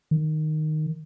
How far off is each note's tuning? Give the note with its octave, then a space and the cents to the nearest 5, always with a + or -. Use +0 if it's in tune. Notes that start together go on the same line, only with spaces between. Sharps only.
D#3 -10